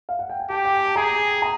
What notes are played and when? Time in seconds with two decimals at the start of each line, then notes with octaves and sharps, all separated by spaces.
0.09 F5
0.19 F#5
0.29 G5
0.40 G#5
0.50 G4 G5 A5
0.65 G5
0.75 G#5
0.86 A5
0.96 G#4 G#5 A#5
1.42 G#5 A#5